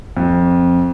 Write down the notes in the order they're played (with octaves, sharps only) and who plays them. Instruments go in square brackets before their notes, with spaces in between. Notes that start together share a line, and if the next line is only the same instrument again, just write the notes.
[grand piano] F2